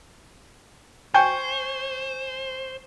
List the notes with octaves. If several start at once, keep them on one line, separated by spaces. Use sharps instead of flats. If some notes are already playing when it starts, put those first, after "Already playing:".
C5 G5 G#5 C#6 G6